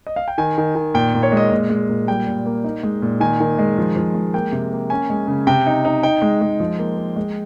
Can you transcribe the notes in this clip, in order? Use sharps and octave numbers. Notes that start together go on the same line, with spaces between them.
D#5
F5
G5
D#3 G#5
D#3
D#3
A#2 G5
A#2
C#5
G#3 D#5
A#2
G#3
A#2
G3 G5
A#2
A#3
D#4
G#3
A#2
D#3 G#5
D#3
G#3
F3
F3
G#3
A#3 G5
C3
A#3
C#4 G#5
G#3
C#3
C3 G5
D#4
D#4
D#4 G5
G#3
G#3
F3
A#3
A#3
G#3